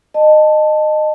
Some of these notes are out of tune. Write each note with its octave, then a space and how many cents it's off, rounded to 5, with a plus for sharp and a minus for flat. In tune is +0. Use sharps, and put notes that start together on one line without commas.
D#5 -20 A5 +0